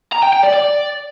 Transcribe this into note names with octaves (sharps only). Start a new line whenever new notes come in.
A#5
G5
G5
D5
D5